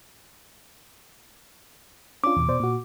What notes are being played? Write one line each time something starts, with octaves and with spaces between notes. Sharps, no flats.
C#4 D4 F4 D6
E2 B2
B2 C5 D5
A#2 F#4